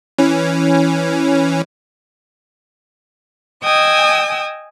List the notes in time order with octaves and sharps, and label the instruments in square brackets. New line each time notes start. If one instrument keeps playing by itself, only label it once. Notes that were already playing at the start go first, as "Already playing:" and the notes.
[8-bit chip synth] E3 C#4
[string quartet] D#5 G5 G#5 D#6 E6